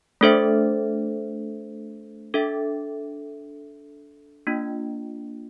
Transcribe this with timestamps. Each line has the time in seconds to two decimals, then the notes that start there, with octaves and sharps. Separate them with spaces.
0.21 A3 D4 A4 C5 E5
2.34 D4 A4 E5
4.47 A#3 D4 F4